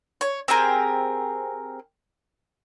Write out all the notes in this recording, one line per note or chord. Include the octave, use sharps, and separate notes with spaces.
C#5
C4 G4 G#4 A#4